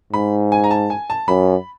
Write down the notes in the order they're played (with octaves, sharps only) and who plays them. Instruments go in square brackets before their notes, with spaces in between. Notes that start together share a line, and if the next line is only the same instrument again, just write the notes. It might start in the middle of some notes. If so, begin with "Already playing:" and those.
[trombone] G#2 [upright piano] B5
[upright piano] G#5
A#5
A5
G#5
A5
[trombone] F#2 [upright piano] B5